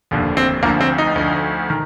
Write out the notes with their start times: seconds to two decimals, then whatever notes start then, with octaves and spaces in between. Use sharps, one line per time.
0.11 F1 D#2 D3 F3
0.37 C4
0.63 D2 D3 F3 A#3
0.81 C4
0.98 D#4
1.15 D2 D3 F3
1.70 D#3